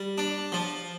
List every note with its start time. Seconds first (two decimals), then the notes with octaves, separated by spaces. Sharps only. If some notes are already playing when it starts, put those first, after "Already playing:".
Already playing: G3
0.18 D4
0.52 F3